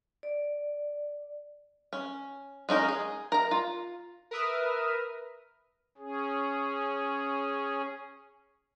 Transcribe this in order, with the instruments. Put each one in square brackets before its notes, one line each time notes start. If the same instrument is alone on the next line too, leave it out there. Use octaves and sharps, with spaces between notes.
[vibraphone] D5
[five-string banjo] C#4
G#3 C#4 D#4 A#4
G#4
A#4 A#5
F4
[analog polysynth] A#4 B4 E5 D#6 F6
[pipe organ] C#4 G#4